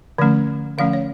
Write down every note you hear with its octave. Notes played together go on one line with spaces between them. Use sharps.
D3 F3 A3 C#4
D3 F3 A3 C#4 F5
C#5